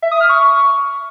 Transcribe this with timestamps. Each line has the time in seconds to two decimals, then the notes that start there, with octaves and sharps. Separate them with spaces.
0.02 E5
0.11 D#6
0.20 F6
0.29 C#6